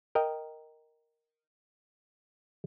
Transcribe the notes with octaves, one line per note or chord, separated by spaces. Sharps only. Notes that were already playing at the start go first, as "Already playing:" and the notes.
A#4 D#5 G5